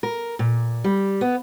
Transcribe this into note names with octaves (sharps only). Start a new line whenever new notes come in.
A#4
A#2
G3
B3